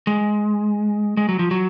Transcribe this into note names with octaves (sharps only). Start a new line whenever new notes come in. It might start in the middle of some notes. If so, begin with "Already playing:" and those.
G#3
G#3
F#3
F3
F#3